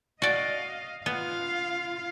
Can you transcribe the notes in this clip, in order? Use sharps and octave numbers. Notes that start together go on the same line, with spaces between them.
F#4 D5 D#5 F5
B3 F4 F5